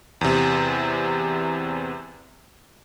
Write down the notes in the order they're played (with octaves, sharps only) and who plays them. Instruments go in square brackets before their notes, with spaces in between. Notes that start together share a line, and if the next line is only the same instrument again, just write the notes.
[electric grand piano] E2 C3